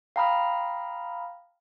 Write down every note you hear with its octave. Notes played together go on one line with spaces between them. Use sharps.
F5 G5 A#5 B5 D#6 F6